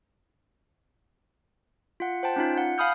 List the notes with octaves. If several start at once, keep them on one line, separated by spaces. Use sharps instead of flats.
F4 F#5
C5 G5 A5
C#4 D#4 F4
F#5
F5 G#5 B5 D#6 F6 G6